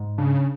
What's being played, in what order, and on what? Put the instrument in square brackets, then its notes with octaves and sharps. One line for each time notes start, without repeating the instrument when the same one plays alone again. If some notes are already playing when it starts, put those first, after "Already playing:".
Already playing: [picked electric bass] G#2
[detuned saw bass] C#3 [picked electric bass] D4